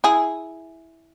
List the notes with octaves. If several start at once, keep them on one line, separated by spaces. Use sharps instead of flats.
E4 G#4